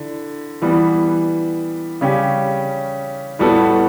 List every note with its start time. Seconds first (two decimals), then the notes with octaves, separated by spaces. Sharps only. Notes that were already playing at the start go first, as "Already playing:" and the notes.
Already playing: D3 E4
0.62 E3 G3 B3
2.01 C#3 G3 C#4 G4
3.39 A2 G3 B3 F#4 A4